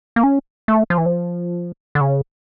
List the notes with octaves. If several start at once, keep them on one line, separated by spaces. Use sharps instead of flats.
A#3
C#4
A3
F3
E3
F3
D3
C#3